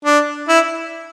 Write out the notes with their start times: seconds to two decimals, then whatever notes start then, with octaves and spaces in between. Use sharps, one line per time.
0.05 D4
0.49 E4